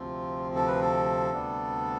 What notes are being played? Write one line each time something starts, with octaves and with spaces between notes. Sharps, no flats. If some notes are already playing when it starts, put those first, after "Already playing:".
Already playing: D2 C3 F3 C4 F4
A4
B4
A4
D2 C3 G3 B3 D4